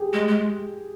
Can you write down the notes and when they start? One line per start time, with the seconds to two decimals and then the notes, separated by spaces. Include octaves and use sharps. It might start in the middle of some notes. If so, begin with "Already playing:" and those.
Already playing: G4 G#4
0.13 G#3
0.28 G#3